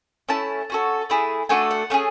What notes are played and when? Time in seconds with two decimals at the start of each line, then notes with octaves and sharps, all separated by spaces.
0.29 A3 C#4 E4 A5
0.70 C#4 F#4 A4
1.10 A3 E4 G#4
1.49 A3 D4 F#4 A4 G#5
1.71 F#5
1.90 A3 C#4 G#4